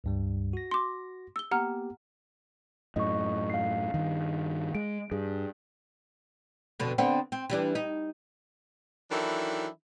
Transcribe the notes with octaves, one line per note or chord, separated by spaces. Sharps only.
C#2 G2 G3
F#4 A#6
C6 D6
E6 G7
A#3 B3 G4 F#5 A#5 F6
F#2 A2 D#5 C#6
F5 C7
G2 D#3
G#3 D7
G2 G#4
F2 B2 D3
D3 B3 C4
C4
E3 G3 D4
D#4
D#3 E3 F#3 D4 E4 A4